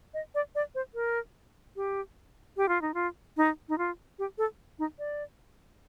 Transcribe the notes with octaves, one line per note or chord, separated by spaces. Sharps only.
D#5
D5
D5
C5
A#4
G4
G4
F4
D#4
F4
D#4
D#4
F4
G4
A4
D#4
D5